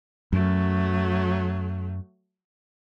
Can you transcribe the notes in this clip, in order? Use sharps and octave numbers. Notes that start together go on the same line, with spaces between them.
F#2 F#3 A3